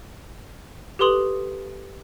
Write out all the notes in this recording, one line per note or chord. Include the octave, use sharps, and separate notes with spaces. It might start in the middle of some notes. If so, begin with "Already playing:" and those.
G4 A4 B4 C6 D#6 F#7